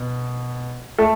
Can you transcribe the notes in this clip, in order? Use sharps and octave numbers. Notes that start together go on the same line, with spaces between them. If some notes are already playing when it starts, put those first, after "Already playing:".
Already playing: B2
A3 A4